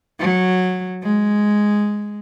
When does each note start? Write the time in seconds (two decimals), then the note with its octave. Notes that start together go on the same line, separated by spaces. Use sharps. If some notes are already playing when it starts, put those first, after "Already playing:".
0.19 F#3
1.03 G#3